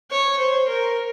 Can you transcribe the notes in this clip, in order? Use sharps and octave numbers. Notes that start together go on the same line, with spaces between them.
C#5
C5
A#4